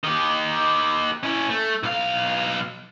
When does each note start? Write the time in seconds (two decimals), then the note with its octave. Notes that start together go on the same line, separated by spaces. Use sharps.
0.04 D#3 G4
1.23 C#4 E4
1.50 A3
1.83 B1 F5